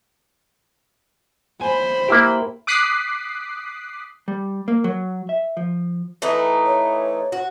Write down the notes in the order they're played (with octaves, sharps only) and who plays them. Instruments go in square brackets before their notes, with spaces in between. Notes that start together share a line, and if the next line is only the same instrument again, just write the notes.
[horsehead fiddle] C5 B5 [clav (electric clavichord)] G#5
[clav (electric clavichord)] A#3 E4 G4
[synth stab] D6 D#6 F#6 B6 C7
[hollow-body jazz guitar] G3
A#3
F#3
E5
F3
[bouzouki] E3 A3 D#4
[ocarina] C#5
[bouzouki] F#4